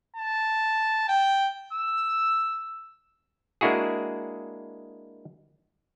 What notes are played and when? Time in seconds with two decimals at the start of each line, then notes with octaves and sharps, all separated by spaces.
0.16 A5
1.09 G5
1.73 E6
3.61 G#3 A#3 D4 E4 F#4 G#4